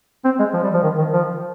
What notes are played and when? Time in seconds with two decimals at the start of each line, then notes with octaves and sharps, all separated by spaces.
0.25 C4
0.39 G#3
0.54 F3
0.64 G3
0.74 F3
0.83 D#3
0.98 D#3
1.13 F3